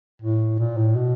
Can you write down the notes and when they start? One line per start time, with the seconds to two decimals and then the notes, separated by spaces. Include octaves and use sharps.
0.22 A2
0.59 A#2
0.77 A2
0.96 B2